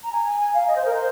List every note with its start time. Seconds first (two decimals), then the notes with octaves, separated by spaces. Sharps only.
0.03 A#5
0.12 G#5
0.26 G#5
0.39 G#5
0.54 F5
0.67 D#5
0.76 C5
0.85 A#4
0.94 C5